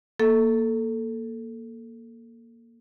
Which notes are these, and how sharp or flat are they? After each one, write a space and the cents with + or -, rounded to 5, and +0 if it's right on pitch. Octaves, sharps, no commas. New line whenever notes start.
A#3 +0 A4 +0